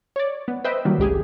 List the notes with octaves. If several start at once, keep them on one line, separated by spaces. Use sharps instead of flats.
C#5 D5
B3
B4 C5 D#5 E5 G5
D#3 E3 F#3 G3 A#3
G#1 C#2 G4 G#4